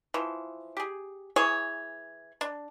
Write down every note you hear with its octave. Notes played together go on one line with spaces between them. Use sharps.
E3 F3
G4 G#4
E3 G#4 C#5
D4